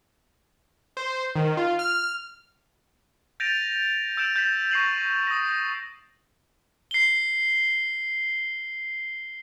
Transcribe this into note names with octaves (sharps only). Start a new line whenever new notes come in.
C5
D#3
F4
F6
G6 A6 A#6 D7 D#7 F7
E6 G6 D7 E7
G6 A6 B6
C#6 A#6 C7 D#7 F#7
D#6 A#6
C7 G7